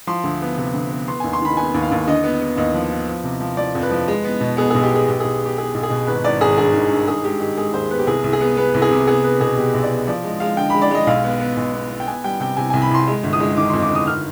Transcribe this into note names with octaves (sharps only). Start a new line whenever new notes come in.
F3 C6
D2
B3
C3
D2
B3
B3 C6
D#2 G#5
C6
D#3 B5
B3 G#5
D#2
F5
D#2
D3 D#5
B3
B3
D#2 D#5
F3
B3
F3
C3
F3
F3 D5
F2
B4
F3
G#3
B3
B2
B3 G#4
B1 G#4
G4
B3 G#4
B1 G4
B1 G#4
B3
G4
B3 G#4
B1
G#4
B2
G#1 B4
G#1 D5
G#1 G#4
G2 G#4
D#3
G2
D#3 G#4
G#3 G4
D#3 G4
G#3 G#4
D#2 C5
B3 B4
G4
C2 G#4
C2
G#4
B3
B3 B4
C2
G#4
C3
B3 G#4
B3 B4
B2 G#4
B2 G4
B1
D5
B3
F3 D5
G#3 D#5
G#3 F5
D3 G5
G#3 B5
D5
G#3 D#5
B1 F5
B3
B3
B1
B3
B3
G5
B3 G#5
G3 G5
C3 G5
C3 G#5
C2 G#5
B5
C2 C6
G#3
G1
D#6
G#3
D#3 D6
F2 C6
D6
G1
D#6
D#3 F6